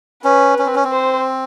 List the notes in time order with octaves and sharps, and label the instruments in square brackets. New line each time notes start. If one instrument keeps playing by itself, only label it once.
[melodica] C#4 [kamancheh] B4
[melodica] C#4
C4
C#4
C4
[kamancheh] C5